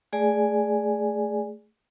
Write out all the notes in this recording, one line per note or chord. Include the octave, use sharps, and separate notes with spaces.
A3 G#4 D5 G#5